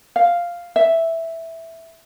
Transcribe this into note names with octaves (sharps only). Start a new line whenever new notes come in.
F5
E5